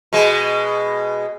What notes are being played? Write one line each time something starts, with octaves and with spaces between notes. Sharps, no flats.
B2 G#3